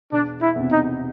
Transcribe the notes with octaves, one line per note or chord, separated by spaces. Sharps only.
E1 D4
E4
E2 C3
D#4